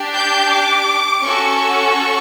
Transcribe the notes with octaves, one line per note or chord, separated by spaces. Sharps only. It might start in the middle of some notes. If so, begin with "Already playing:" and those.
Already playing: D4 G4
G6
D6
C#4 F#4 A4 C#6